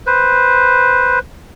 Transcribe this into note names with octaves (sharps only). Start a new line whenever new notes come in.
B4 C5